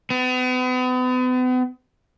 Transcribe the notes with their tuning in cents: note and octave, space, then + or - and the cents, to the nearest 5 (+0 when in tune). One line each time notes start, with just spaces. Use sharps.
B3 +40